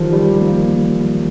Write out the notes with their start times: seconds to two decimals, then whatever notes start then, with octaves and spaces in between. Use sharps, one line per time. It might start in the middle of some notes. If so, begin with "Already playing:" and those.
Already playing: D#3 F3 G3
0.13 G3
0.41 A#3